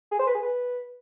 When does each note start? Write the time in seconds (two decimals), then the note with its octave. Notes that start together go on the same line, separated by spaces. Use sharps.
0.12 G#4
0.19 C5
0.27 B4
0.34 G#4
0.42 B4